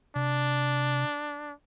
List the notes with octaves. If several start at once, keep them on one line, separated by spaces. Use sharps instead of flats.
C3 D4